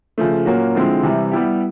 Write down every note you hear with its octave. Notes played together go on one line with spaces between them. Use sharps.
C#3 F3 A3
A#2 F#3 A#3 C#4 F#4
D3 F3 G#3 C4 E4
C3 E3 G3
G3 B3 E4 G4